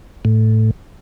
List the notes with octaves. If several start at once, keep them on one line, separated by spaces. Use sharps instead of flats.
A2